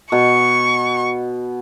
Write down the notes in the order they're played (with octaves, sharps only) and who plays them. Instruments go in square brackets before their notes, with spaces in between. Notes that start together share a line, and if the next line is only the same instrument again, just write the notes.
[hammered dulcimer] B2 [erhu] C#6